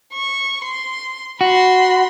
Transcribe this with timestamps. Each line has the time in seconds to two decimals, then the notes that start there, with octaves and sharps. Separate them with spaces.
0.14 C#6
0.65 C6
1.41 F#4 B5 C6